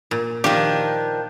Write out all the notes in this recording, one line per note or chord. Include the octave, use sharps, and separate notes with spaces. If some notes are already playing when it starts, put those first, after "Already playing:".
A#2
D#3 F3 D4 G4